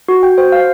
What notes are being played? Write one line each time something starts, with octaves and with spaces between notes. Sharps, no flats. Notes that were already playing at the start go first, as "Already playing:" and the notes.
F#4
G5
C5
F5